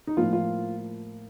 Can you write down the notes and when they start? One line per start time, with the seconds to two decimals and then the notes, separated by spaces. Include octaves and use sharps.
0.07 D#4
0.17 A2 F3 A#3 F4
0.33 F4